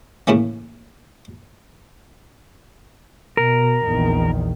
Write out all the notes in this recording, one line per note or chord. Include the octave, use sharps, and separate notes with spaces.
A2 C#3 E3 A#3 C#4
B2 A#4
A#1 E2 D#3